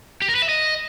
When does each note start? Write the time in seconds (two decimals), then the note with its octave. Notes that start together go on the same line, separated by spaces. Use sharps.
0.22 G4
0.28 A#4
0.35 B4
0.42 E5
0.49 D#5